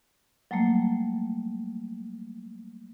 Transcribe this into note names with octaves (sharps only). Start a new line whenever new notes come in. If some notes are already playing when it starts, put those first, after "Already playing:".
F#3 G3 A3 A#3